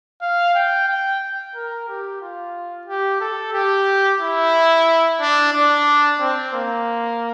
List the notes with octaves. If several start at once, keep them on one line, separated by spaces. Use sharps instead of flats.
F5
G5
G5
A#4
G4
F4
G4
A4
G4
E4
D4
D4
C4
A#3